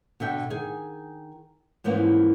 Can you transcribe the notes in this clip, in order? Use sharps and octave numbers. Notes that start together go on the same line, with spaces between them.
B2 D3 E5 G5
D#3 G#4 G#5
G#2 E3 F3 A#3 B3 C#4